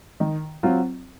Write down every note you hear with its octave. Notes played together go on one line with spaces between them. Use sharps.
D#3
F#3 C4 F4